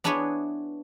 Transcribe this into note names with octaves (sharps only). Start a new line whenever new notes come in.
B3 D4 E4 G#4 B4 C#5